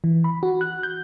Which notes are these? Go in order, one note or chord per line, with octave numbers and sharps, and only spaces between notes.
E3
B5
F#4
F#6
G6